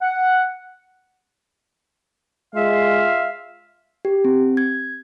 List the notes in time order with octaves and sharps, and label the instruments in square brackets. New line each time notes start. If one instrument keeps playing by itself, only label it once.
[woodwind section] F#5
[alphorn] G#3 [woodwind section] F4 E5 F5
[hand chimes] G4
C4
G#6